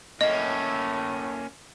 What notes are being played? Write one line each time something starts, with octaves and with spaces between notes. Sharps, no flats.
A2 A3 A#3 C#4 D#5